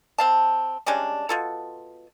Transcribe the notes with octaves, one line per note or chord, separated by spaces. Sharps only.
C4 F5 A5
G3 G#3 C#4 D4
B2 F4 A4